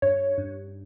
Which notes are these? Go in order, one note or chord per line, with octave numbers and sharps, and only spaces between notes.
G2 C#5
G2